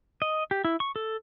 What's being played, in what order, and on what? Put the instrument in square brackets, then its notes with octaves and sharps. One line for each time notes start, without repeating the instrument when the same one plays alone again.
[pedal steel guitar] D#5
G4
E4
C#6
A4